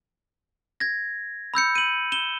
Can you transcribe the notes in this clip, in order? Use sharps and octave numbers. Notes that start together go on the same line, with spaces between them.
G#6 A#6
B5 E6 G6 C#7
D#7 F#7
E7 G7